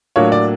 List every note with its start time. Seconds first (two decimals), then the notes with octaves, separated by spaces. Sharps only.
0.16 A2 F#3 A#3 D4 F4 C#5
0.32 D5